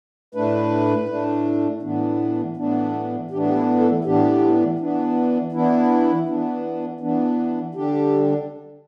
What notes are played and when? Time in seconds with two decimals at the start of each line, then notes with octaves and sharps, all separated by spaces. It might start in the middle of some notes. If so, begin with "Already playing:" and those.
0.35 A2 A3 D4 B4
1.08 A2 A3 D4
1.82 A2 E3 B3 D4
2.57 A2 E3 B3 D4
3.31 A2 E3 B3 D4 G4
3.47 G4
3.55 E4
3.80 A4
3.99 E4
4.04 A2 E3 B3 D4 G4
4.79 E3 B3 D4
5.52 E3 B3 D4 E4
6.26 E3 B3 D4
7.01 E3 B3 D4
7.75 D3 G3 D4 G4